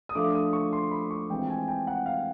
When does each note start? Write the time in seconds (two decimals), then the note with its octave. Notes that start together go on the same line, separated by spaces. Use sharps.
0.09 D#6
0.15 F3 A3 D4 F4 D6
0.35 D#6
0.53 C#6
0.73 C6
0.91 B5
1.11 C#6
1.29 E3 G#3 C4 F4 G5
1.43 G5
1.50 G#5
1.68 G5
1.87 F#5
2.06 F5